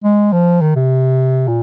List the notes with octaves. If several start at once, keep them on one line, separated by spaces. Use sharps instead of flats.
G#3
F3
D#3
C3
A#2